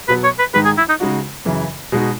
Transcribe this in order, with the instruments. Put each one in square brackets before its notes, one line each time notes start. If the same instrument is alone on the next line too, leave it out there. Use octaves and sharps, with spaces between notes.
[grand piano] B2 F#3 B3 [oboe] B4
[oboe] C#5
B4
[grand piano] G#2 D#3 G#3 D#4 [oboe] B4
[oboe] G#4
E4
D#4
[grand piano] C#3 G#3 D#4 F#4
F#2 C#3 E3
B2 G#3 D#4 F#4